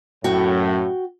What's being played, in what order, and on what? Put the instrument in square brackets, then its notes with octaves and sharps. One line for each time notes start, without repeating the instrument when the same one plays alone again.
[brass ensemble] F#2 A2 [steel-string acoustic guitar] F#4 G5